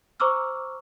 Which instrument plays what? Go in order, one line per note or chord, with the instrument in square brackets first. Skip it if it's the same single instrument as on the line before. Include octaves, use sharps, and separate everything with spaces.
[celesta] C5 A#5 C#6 D6 E6 F6